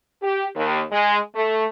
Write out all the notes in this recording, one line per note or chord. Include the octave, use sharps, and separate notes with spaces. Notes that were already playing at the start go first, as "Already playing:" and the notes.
G4
D#2
G#3
A3